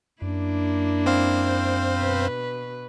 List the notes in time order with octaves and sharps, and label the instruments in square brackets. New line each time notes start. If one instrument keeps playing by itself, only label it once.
[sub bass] F#2 [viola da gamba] A#3 D4 E4
[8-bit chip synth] C4 C5 F5
[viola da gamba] B2 B4